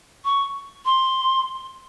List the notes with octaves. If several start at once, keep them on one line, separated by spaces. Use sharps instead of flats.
C#6
C6